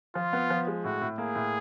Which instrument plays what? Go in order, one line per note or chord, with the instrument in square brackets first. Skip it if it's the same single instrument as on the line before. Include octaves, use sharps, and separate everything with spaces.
[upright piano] F3 [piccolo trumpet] F4
[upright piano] B3
F3
G#3
[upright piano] A2 [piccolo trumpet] F#4
[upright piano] A2
[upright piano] A#3 [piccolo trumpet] G#4
[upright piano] A2